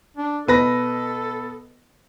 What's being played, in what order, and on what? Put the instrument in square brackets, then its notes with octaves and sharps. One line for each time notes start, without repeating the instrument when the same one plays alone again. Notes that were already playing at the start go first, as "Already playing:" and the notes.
[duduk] D4
[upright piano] B2 B4 A#6 [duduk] A4